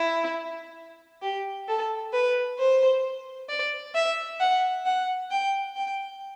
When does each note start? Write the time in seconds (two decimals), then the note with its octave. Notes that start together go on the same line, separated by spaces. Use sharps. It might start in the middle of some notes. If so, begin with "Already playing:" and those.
Already playing: E4
1.22 G4
1.68 A4
2.13 B4
2.58 C5
3.49 D5
3.95 E5
4.40 F#5
4.86 F#5
5.31 G5
5.76 G5